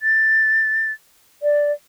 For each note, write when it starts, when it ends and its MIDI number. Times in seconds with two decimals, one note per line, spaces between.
0.02 0.92 93
1.43 1.72 74